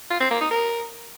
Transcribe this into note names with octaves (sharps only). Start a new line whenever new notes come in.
F4
C4
A#3
D#4
A#4